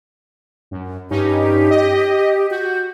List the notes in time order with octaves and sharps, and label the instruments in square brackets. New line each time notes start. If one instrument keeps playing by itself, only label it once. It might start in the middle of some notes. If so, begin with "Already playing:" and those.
[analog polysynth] F#2
[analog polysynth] G2 C#4 D#4 [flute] G4
[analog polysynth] D#5
[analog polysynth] F#4 [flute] G6